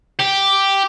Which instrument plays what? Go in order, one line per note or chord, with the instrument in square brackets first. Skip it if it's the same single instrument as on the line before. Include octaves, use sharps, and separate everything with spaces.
[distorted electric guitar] G4